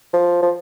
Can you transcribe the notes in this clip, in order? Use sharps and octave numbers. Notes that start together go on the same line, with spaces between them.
F3
F3